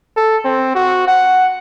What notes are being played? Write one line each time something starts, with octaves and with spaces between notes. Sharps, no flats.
A4
C4
F#4
F#5